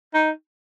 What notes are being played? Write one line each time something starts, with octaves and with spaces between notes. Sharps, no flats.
D#4